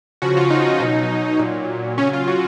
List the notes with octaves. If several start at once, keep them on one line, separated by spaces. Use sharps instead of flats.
C#3 F3 F#4
F4
D#4
B2 F#3
A#2 F#3
C#3 F#3 C#4
F4
F#4